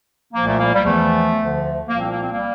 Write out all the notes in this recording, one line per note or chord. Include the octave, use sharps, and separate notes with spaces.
C2 A#2 F3 A#3
A3
G3 A#3
G3
E2 E3 F3 A3
D2 D3 F3
C2 A#2 F3 A#3
C4
A#3
C4
G3 A#3